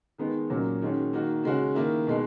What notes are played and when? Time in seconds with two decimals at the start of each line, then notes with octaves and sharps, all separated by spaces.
0.18 D#3 G#3 B3 D#4
0.50 A#2 F#3 A#3 C#4
0.82 D#3 G#3 C#4 F#4
1.13 D#3 A#3 D#4 F#4
1.43 C#3 G#3 C#4 F#4
1.75 D#3 A#3 E4
2.07 B2 G#3 D#4